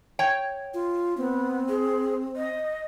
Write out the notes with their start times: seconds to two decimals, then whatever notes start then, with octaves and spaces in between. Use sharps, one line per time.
0.19 C#5 G5
0.74 F4
1.17 B3 C4
1.69 G#4
2.36 D#5